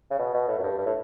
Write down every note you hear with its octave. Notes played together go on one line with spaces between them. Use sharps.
C#3
B2
B2
A2
F#2
G2
G2
A2